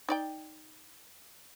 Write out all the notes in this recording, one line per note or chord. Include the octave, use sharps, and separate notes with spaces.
D#4 D5 G5